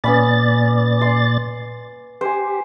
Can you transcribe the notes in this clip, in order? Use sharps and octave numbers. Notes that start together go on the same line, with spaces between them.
A#2 B3 C#4 D5 B5 A6
C6
G4 C5 G#5